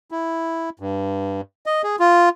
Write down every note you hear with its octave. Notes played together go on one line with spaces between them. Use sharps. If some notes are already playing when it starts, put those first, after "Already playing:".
E4
G2
D#5
G#4
F4